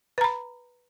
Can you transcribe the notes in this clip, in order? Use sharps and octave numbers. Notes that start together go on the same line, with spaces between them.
B4 A#5 B5